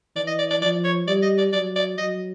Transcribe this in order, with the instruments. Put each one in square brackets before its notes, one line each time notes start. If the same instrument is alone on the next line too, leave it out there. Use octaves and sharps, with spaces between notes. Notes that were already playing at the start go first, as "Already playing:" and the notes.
[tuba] E3 [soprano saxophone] D5
[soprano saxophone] D#5
D5
D5
[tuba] F3 [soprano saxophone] D5
[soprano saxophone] C#5
[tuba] G3 [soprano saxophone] D5
[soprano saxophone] D#5
D5
[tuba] F#3 [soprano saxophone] D5
[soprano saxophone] D5
[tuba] F#3 [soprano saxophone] D#5